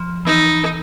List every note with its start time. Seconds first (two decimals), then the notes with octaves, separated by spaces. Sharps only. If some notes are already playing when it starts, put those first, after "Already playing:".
Already playing: F3
0.25 E3 D#4